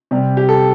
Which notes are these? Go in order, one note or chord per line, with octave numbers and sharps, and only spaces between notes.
C3 G3
G4
A4